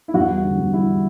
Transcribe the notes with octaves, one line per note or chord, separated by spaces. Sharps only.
E4
E2 F#4
G3
D3
E2
G3 E4